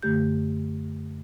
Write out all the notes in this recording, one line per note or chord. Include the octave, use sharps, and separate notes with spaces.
F#2 D3 A3 G4 G6